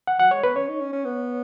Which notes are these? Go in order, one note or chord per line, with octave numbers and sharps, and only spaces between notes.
F#5
F#3 F#5
G#3 C#5
B3 B4
C#4 C#5
D#4
C#4
C#4
B3